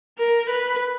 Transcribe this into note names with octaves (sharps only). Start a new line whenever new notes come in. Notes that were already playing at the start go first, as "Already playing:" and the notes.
A#4
B4